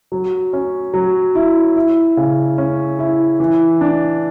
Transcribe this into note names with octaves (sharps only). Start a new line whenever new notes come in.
F#3
C#4
F#3
E4
E4
C#3
C#4
E4
E3
D4